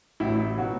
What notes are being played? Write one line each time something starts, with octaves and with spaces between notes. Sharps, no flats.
A1 A2 F#3 E4
B2 F#3 F#4